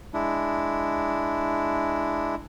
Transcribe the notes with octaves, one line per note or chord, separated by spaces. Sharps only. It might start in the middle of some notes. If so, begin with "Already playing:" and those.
G#3 D4 E4